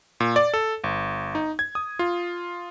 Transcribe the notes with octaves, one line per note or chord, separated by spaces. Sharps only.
A#2
D5
A4
G1
D#4
G#6
D#6
F4